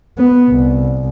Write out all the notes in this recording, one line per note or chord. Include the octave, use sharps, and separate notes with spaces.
B3
C2